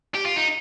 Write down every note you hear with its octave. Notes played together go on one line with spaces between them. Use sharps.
G4
F4
D#4